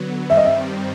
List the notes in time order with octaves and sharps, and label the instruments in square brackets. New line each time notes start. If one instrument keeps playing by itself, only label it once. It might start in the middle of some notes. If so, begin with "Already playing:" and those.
Already playing: [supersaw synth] D3 F#3 B3
[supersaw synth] G2 D#3 G3 C4 [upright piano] E5
[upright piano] D#5
E5